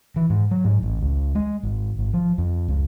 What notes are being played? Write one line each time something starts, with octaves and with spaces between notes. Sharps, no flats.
E3
G#2
F#3
G#2
A1
C#2
G#3
G#1
G#1
F3
F2
C#2